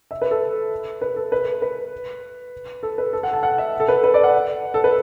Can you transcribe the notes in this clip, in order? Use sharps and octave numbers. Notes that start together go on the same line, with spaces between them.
E5
B4
A4
B4
A4
B4
B4
A4
B4
A4
F#5
A5
F#5
E5
A4
B4
B4
D5
F#5
A4
B4